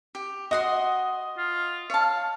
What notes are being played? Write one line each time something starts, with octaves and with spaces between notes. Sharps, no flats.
G4
F#4 D#5 F#5 C6
F4
C#5 F5 A5